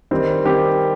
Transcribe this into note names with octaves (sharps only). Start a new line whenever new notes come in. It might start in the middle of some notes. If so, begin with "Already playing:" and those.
D#3 G3 C4
D#3 G3 C4 G4